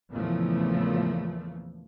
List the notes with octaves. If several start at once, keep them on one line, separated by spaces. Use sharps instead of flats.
E2 A#2 C#3 E3 F3 A3